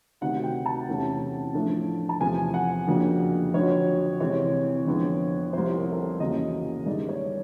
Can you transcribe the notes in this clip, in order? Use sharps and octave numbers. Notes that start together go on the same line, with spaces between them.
D2 C3 D#3 F#3 F#5
G5
A5
E2 C3 E3 A3 C#4
A2 F3 A3 D4
A5
E2 C3 F3 A3 G#5
F#5
F2 C#3 F#3 A#3 D4
F2 D3 F#3 C#5
C3 E3 G#3 C4 C#5
F2 D3 F3 G#3 B3
C2 C3 F3 C5
A#4
A4
A#4
E2 C#3 F#3 A#3 C#4 D#5
G2 D#3 G#3 D5
C#5